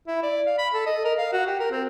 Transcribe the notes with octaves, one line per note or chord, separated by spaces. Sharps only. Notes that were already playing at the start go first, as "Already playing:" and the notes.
E4
D5
F5
B5
A4
D#5
A#4
F5
F#4
G4
A#4
C4